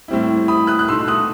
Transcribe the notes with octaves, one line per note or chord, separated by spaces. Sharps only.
A2 G3 C4 E4
B5 D#6
D#6 F#6
F#6
B2 A3 D#4 C6 E6
D#6 F#6